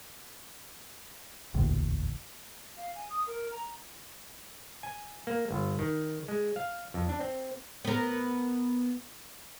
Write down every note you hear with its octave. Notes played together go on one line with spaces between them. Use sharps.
E1 A1 D2 A#2
F5
G#5
D#6
A#4
A#5
G#5
A#3
G1
D#3
G#3
F5
F2
D4
C4
B3 A#4